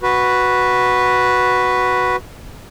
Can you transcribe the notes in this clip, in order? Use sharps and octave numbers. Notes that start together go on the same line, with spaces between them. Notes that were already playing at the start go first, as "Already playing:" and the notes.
F#4 B4